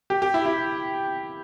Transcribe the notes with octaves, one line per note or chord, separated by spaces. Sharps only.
G4
G4
E4
E4